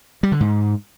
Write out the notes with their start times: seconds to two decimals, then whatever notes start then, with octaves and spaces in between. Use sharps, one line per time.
0.23 G3
0.32 D3
0.40 G#2